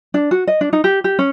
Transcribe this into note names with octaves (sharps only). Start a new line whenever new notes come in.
D4
F#4
D#5
D4
D#4
G4
G4
C#4